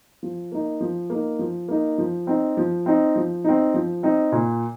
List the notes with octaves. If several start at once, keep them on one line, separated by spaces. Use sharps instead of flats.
F3
A#3 D#4
F3
A#3 D#4
F3
A#3 D#4
F3
C4 D#4
F3
C4 D#4
F3
C4 D#4
F3
C4 D#4
A#2